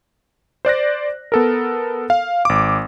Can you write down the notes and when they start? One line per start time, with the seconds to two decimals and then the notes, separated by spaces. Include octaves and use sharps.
0.65 C5 D5 F#6 A#6
1.32 B3 A4 A#4
2.10 F5
2.45 G#1 D6